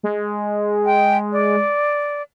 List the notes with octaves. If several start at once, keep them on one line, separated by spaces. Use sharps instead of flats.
G#3
G5
D5